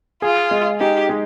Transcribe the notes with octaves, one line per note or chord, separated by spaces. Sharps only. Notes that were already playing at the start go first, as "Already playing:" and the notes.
F4 G#4
G#3
D#4 G4
G#3